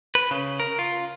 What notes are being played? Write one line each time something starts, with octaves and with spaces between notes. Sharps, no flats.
B4
C#3
A#4
F4